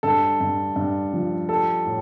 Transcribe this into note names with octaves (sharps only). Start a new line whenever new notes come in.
G2 A4
G2
G2
F3
G3 A4
A2